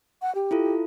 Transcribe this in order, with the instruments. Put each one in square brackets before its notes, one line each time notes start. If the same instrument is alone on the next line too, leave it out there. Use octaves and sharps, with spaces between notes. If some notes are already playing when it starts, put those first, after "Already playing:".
[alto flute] F#5
G4
[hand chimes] E4 F4 A4